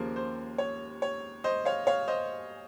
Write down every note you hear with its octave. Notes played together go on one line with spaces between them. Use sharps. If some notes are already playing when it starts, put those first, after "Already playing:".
Already playing: D#2 C#3 F3 A#3 C5
C5
C#5
C#5
C5 D#5
C#5 F5
C#5 F5
C5 D#5